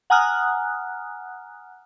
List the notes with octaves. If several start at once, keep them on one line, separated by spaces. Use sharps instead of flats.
F#5 G#5 A#5 D#6 F6 F#6